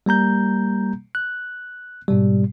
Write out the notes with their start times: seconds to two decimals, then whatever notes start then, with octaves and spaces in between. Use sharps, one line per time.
0.06 G3 A#3 A#5 G6
1.15 F#6
2.08 G#2 B2 G3